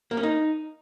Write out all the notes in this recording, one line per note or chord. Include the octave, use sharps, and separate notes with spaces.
A#3
C#4
D#4